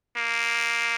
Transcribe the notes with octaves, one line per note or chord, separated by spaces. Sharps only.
A#3